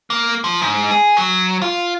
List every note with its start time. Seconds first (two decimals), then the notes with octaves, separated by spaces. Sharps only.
0.10 A#3
0.44 F3
0.62 G#2
0.91 G#4
1.17 F#3
1.62 F4